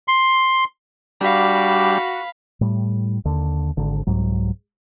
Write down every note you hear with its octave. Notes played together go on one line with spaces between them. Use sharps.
C6
G3 D4 F#4 F5 B5
A2 G3
D#2 D3
G#1 D3
C2 G#2 F#3